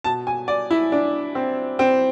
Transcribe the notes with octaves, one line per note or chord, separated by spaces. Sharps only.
B2 A5
G#5
D5
E4
D4
C4
C4